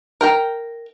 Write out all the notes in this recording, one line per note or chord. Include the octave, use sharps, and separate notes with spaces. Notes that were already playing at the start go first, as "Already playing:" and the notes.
A#4 G5 A#5